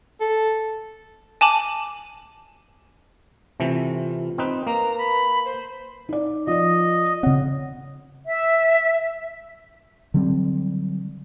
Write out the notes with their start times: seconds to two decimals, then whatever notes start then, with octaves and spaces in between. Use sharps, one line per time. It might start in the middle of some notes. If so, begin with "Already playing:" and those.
0.20 A4
1.41 G#5 A5 D6 F#7
3.60 C3 E3 A3 F4
4.38 C4 D#4 B4
4.67 A#3 B4 A#5
4.98 B5
5.45 C5
6.09 D#4 D5
6.47 F3 D5 D#5
7.23 C#3 C4 C#5 F#5
8.26 E5
10.14 D3 F#3 G3 C4